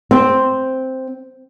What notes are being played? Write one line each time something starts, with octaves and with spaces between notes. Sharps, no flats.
C4